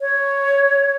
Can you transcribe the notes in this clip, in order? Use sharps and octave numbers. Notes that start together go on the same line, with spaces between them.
C#5